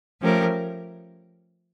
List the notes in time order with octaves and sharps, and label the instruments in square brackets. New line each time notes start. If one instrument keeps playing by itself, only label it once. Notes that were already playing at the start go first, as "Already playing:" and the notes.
[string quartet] F3 A3 C#4 G4 A#4